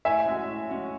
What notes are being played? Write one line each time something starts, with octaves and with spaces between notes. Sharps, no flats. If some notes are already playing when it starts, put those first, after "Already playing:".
A2 E5 G#5
G#3 C#4 F#4
A2
G#3 C#4 F#4